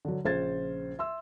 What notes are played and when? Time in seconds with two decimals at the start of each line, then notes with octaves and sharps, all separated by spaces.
0.05 D3 F#3
0.24 A#1 C#3 C5 G#6 A6
0.99 E5 C6 E6